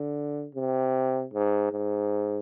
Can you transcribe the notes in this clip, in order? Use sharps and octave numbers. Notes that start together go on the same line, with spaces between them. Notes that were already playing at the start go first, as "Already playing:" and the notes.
Already playing: D3
C3
G#2
G#2